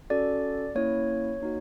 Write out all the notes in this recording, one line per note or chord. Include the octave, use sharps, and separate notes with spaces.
C#4 F#4 A4 D5
A#3 C#4 E4 C#5
A#3 D#4 F#4